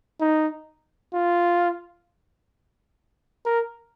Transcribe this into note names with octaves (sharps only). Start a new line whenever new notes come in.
D#4
F4
A#4